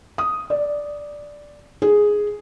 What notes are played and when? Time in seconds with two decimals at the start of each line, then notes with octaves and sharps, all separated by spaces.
0.18 D#6
0.50 D5
1.82 G#4